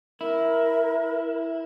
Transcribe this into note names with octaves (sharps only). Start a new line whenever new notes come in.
E4 A#4